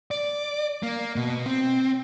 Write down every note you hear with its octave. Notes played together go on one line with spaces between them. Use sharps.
D5
A#3
B2
C4